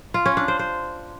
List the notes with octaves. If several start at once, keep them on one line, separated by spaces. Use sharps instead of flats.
F4
C#4
D4
C5
C5